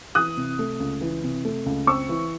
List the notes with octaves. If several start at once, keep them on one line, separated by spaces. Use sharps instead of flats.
E3 D#6 F#6
C3
A3
C#2
E3
C3
A3
C#2
C4 C#6 E6
E3